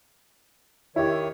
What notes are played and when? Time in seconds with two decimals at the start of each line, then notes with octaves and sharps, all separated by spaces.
0.96 D#3 E4 G4 C#5